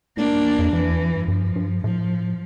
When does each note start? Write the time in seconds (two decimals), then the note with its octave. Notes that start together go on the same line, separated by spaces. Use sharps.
0.17 A2 A#3 D4
0.31 G2
0.45 E2
0.59 F2
0.73 F2 E3
0.87 E2
1.00 F2
1.14 G2
1.28 G2 F3
1.56 G2
1.84 A2 F3